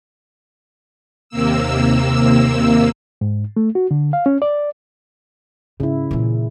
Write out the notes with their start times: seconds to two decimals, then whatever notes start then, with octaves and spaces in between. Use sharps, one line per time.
1.29 D#2 C3 A#3 E6
3.21 G#2
3.57 A3
3.75 F#4
3.91 D3
4.13 F5
4.26 C#4
4.42 D5
5.80 G#2 C#3 E4
6.11 A#2 E3